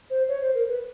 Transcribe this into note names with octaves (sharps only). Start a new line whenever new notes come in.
C5
C#5
C5
A#4
B4